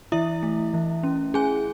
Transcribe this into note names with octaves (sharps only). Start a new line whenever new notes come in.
E3 E4 E5
A3
E3
C#4
C#4 G#4 G#5